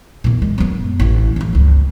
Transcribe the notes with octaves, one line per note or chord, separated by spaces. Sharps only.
E2 A#2
G#3
F#2 B3
A1 E3
F2 F3
G1 C#2